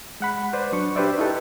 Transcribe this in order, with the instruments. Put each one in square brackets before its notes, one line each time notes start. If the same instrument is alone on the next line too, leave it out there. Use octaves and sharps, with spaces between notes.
[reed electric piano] G#3 F#5 B5
B4 C5 D5
F#3 D4 C#6
D4 G4 B4 C5 D5 E5
D#4 E4 G4 A4 B4